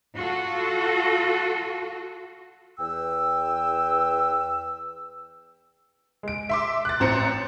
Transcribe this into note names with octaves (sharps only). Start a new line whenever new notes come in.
F4 F#4 A4
E2 B4 G5 E6
G#3 D7
E5 C6 D6
F#6 A6
A1 C4 A#5 C#7